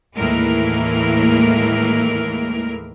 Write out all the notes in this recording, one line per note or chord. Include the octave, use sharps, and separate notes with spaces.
D#2 A2 E3 G#3 A#3 A#4